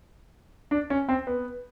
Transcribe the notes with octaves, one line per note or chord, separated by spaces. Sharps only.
D4
C#4
C4
B3